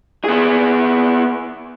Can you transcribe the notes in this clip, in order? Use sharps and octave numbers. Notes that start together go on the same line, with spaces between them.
B3 G#4